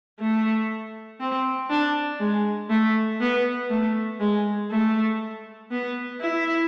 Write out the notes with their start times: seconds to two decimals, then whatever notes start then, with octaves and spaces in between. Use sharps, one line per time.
0.20 A3
1.20 C4
1.70 D4
2.20 G#3
2.70 A3
3.21 B3
3.70 A3
4.20 G#3
4.70 A3
5.71 B3
6.21 E4